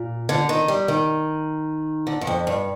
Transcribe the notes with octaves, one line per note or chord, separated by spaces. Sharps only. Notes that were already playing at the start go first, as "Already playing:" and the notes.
Already playing: A#2
D3
D#3
G3
D#3
D3
G2
F2
G2